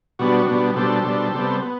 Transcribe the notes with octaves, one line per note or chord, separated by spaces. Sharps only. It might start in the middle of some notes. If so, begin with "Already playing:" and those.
B2 G3 B3 D4 F#4
B2 G3 B3 D4
B2 G3 D4 A4 C5
B2 G3 D4
C3 G3 B3
B3